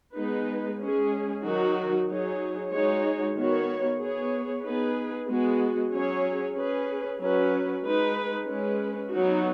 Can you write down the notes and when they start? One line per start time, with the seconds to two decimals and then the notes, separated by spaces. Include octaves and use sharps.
0.16 G#3 B3 D#4 B4
0.80 G#3 C#4 G#4
1.44 D#3 F#3 D#4 F#4
2.08 F#3 D#4 G#4 C#5
2.71 G#3 D#4 F#4 C#5
3.36 D#3 B3 F#4 C#5
3.99 B3 G#4 C#5
4.63 B3 D#4 G#4 B4
5.27 G#3 B3 F#4
5.91 F#3 C#4 G#4 C#5
6.56 C#4 G#4 B4
7.19 F#3 C#4 B4
7.83 G#3 D#4 B4
8.47 G#3 C#4 B4
9.11 F#3 B3 D#4 F#4